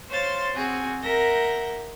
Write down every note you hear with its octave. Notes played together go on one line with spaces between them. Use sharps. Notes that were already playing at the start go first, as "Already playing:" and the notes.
C5 C#5 F5 C6 A6
C4 F#4 G#4
A#4 E5 F#5 A#5 G6 A#6